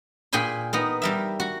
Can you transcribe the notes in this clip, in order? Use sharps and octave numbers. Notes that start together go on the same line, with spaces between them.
A#2 G#4 G5 G#5 B5
B3 D#4 A#4
G3 A#4 E5
F#4